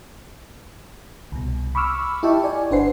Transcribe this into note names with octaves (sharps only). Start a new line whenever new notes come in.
C2 B2
B5 C#6 D6 E6 F6
E4 G4 D#5 G5 A5 C#6
E4 D5 G#5
G1 D4 B4 C5 F#5 C7